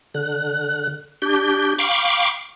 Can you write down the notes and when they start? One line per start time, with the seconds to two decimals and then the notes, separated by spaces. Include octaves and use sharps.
0.14 D3 F#6
1.22 D4 G4 G6
1.79 F5 G5 B5 C#6 D6